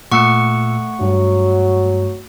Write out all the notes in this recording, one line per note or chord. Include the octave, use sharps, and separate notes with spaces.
A#2 A3 F#5 C#6 E6 C#7
G2 F#3